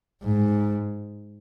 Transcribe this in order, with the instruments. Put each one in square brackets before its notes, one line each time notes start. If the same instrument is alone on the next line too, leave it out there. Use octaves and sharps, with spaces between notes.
[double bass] G#2